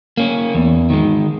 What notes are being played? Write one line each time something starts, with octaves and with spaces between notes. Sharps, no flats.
A#3 C#4
E2
D#3 G#3